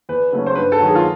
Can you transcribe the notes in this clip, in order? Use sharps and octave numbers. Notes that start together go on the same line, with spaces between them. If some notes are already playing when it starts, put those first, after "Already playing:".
E2 B4
C#3 F#3 A3 C#4
C5
G2 B4
A4
D#3 F#3
G#4
F4